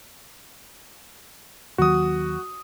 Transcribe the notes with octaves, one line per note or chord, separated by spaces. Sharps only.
D#2 D#3 F#3 F#4 D#6